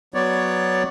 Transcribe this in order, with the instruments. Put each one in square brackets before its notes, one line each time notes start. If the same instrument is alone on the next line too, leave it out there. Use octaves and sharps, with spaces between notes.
[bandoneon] F#3 B3 C#5 D5